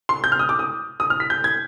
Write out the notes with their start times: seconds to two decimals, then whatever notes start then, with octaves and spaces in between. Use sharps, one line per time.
0.09 C6
0.24 G6
0.32 F6
0.39 D#6
0.49 D6
0.59 D#6
1.00 D#6
1.10 F6
1.20 B6
1.30 G6
1.44 G#6